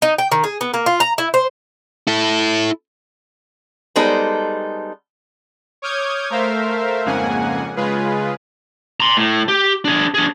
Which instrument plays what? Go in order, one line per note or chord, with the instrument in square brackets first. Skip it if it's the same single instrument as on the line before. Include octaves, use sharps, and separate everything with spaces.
[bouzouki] D#4
G5
D#3
G#4
B3
A#3
F4
A#5
E4
C5
[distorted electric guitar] E4 A4
[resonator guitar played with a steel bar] G3 G#3 B3 D#4 A4 C5
[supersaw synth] C#5 D6 D#6 F6 G6 G#6
A3 A#4 C5 E5 F5
F2 G#2 C#3 A#3 F#5 G#5
C#3 G#3 F4 G#4 B4
[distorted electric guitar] A#5 C6
A2
G4
D4 G#4
D4 G#4